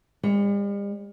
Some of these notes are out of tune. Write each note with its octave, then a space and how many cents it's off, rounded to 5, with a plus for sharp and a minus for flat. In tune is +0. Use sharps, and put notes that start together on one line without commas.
G3 +45 C#5 +0